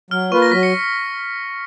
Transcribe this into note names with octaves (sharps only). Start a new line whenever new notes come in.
F#3 F6
A#3 F4 B4 C#6
A#6
F#3 B6
C#7